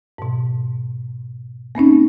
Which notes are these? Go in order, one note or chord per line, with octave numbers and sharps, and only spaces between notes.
G#2 B2
A#3 C4 C#4 D#4